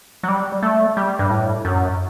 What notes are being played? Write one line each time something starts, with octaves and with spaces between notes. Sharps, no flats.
F#3
G3
A3
G3
G2
A2
F#2